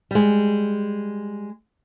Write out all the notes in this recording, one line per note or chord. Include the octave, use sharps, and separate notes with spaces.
G3 G#3